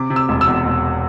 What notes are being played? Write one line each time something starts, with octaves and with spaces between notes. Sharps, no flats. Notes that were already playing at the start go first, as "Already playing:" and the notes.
Already playing: C3 D6
C3
E6
E1
E6
E2
E1